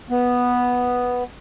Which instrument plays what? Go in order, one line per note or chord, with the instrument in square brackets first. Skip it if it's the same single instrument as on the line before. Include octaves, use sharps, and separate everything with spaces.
[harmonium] B3